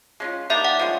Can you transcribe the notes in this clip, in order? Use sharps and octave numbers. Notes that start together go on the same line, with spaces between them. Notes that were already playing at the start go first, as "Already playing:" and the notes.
G#3 C#4 F4
D#3 G3 A#3 D4 E5
F#5
F3 G#3 C#4